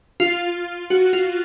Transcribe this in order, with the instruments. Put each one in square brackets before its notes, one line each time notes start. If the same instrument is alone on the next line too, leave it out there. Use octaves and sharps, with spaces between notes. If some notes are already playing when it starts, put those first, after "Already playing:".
[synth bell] F4
F#4
F4